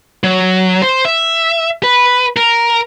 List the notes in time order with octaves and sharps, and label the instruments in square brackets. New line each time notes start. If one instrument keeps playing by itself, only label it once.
[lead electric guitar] F#3
C5
E5
B4
A#4